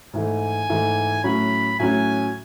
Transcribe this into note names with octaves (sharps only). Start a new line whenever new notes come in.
G#2 E3 A3 G#5
G#2 E3 A3
A2 F#3 C#4 F#4 B5
A2 F#3 C#4 F#4 G#5